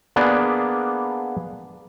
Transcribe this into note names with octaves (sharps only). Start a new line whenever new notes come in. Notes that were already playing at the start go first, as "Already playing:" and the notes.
A#3 B3 D4 G#4 D5